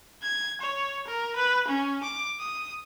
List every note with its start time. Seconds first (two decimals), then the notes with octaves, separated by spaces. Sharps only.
0.23 G#6
0.61 C#5
1.07 A#4
1.36 B4
1.68 C#4
2.03 D6
2.40 D#6